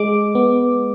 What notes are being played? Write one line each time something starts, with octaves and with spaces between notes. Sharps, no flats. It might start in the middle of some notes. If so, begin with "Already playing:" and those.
Already playing: G#3 D6
B3